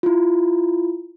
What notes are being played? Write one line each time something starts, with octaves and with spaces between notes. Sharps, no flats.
E4 F4